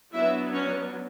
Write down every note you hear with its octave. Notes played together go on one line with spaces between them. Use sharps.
F#3 B3 D4 E4 E5
C#4 C#5